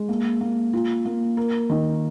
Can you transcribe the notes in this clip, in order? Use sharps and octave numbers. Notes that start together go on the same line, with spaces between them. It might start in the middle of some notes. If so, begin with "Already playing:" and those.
Already playing: G#3
A#3
A#3
F4
A#3
A#4
D#3